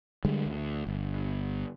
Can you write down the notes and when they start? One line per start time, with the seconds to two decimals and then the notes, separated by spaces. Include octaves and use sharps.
0.25 D3 G3 G#3
0.46 D2
0.87 G1